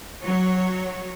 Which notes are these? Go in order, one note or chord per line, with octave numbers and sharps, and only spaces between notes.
F#3 C#5